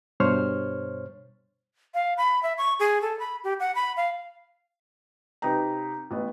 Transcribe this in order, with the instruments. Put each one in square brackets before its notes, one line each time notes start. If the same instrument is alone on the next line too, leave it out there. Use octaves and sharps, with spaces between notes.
[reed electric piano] G2 B2 C5 C#5 F6
[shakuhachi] F5
B5
E5
C#6
G#4
A4
B5
G4
F#5
B5
F5
[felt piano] C3 D#4 B4 G5 A#5
A1 B3